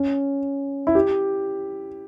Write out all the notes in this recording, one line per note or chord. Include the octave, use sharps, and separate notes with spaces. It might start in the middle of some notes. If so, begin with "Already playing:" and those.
Already playing: C#4
E4
G4